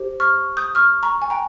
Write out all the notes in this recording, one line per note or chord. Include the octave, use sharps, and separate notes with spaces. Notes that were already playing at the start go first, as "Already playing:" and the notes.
Already playing: G4 C5
C#6 F6
D#6 G6
C#6 F6
A#5 C#6
G#5
G5 A#5